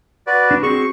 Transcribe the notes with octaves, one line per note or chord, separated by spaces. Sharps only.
F#4 B4 D5
D4
C4 F#4 G#4 C#6